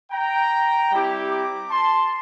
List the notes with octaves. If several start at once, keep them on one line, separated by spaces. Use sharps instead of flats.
G5 A#5
G3 C4 E4 G4
A#5 D6
A5 C6